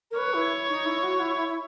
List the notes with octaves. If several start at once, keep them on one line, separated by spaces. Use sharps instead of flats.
A#4
B4 C#5
E4
D#4
E4
F#4
E4
E4
E4